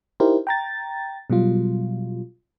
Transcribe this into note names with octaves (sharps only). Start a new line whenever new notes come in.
D#4 E4 G4 A#4 C5
G5 A#5 A6
B2 F#3 G3 F4